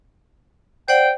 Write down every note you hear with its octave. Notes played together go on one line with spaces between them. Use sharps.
C5 D5 F#5 G5